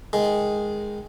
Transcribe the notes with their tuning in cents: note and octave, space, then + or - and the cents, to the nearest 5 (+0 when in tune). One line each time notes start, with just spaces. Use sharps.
D#3 +0 G#3 +0